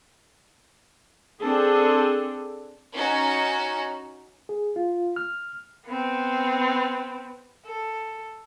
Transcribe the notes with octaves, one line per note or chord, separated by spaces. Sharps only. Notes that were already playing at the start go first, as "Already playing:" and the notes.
C4 D4 G#4 A4
C#4 D#4 F#4
G#4
F4
F6
B3 C4
A4